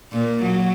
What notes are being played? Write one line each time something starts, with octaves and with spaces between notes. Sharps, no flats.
A#2
F#3